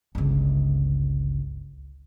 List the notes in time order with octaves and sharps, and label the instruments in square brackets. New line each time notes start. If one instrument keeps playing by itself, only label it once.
[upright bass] G1 C#2